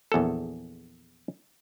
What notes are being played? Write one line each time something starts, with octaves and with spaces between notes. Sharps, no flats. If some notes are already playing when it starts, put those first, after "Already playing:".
A#1 E2 G#4 A4